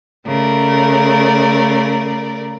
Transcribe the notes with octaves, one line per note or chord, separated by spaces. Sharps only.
C#3 A3 A#4 D5